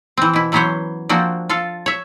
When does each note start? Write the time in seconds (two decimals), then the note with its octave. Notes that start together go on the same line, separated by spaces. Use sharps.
0.17 E3 C4
0.33 B2 E4
0.52 E3 F#3 B3 C#4 C5 C#5
1.09 F3 A#3 C4 D4 F#4
1.49 F4 A4 F5
1.86 C#5 E5